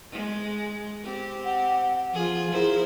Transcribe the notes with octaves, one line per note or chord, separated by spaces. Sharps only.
G#3
C4 G4
F#5
F3 F4 G#4
E4 G#4 A#4 C5